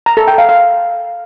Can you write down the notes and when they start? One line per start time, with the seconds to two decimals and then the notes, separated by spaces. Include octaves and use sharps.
0.06 A#5
0.17 A4
0.28 G5
0.38 F5
0.49 F5